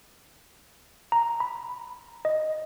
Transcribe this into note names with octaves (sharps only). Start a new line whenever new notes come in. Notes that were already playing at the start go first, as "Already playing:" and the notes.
A#5
B5
D#5